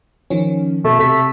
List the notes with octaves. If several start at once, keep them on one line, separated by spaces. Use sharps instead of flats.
D#3 F3 C#4
B2 A3
C3 A3 B6